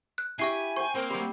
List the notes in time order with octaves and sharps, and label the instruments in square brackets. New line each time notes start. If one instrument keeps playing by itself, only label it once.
[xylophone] F#6
[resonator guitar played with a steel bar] E4 G4 [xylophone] E5 C#6 C7 [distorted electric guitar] G#5
[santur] C5 G5 [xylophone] C#6
[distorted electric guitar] A#3 [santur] C4
[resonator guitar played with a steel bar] F#3 C5 [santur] G3